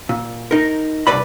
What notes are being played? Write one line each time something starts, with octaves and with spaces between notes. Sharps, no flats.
A#2
D#4 A#4
C2 G2 B4 D5 B5